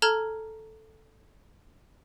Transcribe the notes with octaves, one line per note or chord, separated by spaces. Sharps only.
A4 A5 A#5 F6 G#6 G7